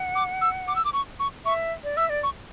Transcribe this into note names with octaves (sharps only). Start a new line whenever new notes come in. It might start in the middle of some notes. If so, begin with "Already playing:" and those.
Already playing: F#5
D6
E6
D6
E6
D6
C#6
C#6
E5 C#6
D5
E5 E6
D5
C#6